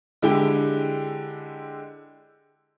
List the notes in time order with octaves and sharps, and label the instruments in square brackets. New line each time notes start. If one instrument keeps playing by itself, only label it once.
[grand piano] D3 G#3 E4 G4 G5